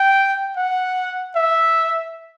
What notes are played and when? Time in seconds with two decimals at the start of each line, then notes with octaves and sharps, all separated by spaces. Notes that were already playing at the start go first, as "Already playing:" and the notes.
Already playing: G5
0.56 F#5
1.36 E5